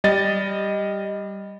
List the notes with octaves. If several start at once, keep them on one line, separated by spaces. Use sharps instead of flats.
G3 D#5 A6